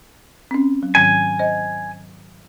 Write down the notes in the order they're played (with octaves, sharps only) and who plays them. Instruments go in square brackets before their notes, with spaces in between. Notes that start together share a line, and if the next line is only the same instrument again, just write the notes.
[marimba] C4 C#4
F#3
[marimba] G#2 D#3 F#3 [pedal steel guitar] G#5
[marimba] C5 D#5